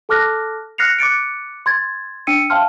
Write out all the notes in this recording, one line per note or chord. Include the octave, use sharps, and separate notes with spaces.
A4 A5 D6 F6 F#6 A#6
F6 F#6 A#6 C7 C#7 F7
D6 F#6 A6 C#7 D7
C6 G#6 A6
D4 G5 E6 C#7 D#7
E5 F5 G5 A5 C6 F6